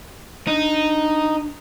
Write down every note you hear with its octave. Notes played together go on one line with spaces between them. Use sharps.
D4 D#4